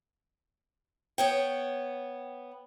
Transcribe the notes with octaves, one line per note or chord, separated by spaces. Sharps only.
B3 C#5 G5